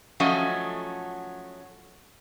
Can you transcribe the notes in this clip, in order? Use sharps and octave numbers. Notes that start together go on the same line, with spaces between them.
F3 F#3 A3 C#4 D#5